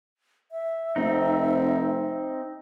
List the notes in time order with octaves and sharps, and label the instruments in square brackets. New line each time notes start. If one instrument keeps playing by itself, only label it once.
[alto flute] E5
[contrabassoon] F1 [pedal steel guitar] C4 D#4